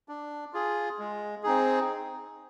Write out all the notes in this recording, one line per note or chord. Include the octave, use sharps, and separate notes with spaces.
D4
F4 G#4
G#3
C4 D#4 G#4